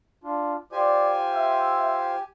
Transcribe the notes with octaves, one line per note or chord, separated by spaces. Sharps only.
D4 F4
F4 G4 C5 D5 G#5
E5